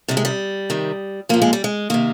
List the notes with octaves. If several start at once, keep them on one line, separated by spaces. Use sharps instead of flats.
C3 D#3 G3
G#3
G3
C3 D#3
A#2 F3 A#3
G#3
G3
G#3
C3 D#3 A#3